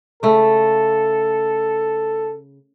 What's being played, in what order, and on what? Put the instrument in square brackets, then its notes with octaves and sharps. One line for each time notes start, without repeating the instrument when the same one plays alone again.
[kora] C#3 A3 [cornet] A4